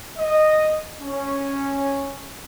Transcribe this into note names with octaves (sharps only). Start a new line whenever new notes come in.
D#5
C#4